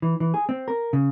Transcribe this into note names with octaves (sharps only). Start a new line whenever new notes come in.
E3
E3
G#4
C4
A#4
C#3